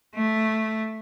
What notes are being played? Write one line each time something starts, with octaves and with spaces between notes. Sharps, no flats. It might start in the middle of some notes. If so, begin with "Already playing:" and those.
A3